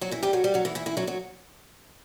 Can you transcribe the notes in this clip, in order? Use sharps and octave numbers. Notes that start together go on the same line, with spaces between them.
F#3 F#4
E3 E4
G3 G4
F#3 F#4
G3 G4
F#3 F#4
E3 E4
E3 E4
E3 E4
F#3 F#4
F#3 F#4